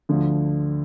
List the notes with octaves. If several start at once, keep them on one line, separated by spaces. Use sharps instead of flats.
D2 D3 F3